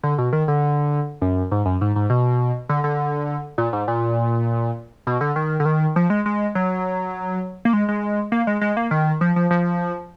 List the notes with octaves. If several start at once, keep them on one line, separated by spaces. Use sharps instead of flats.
D3
B2
D#3
D3
F#2
G#2
F#2
G#2
G#2
B2
D3
D3
A#2
G#2
A#2
B2
D3
D#3
D3
D#3
F3
G#3
G#3
F#3
A#3
G#3
G#3
A#3
G#3
G#3
A#3
D#3
F3
F3
F3